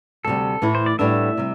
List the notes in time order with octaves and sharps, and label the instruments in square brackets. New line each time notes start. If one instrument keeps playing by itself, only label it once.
[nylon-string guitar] D2 C3 G3 [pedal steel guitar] A4
[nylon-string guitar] A2 E3 A3 E4
[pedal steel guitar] C5
D5
[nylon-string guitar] A2 G3 B3 D4 [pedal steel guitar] E5
[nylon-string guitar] C3 G3